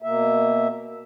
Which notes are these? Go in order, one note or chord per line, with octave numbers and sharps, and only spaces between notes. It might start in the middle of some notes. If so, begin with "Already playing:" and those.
B2 A#3 E5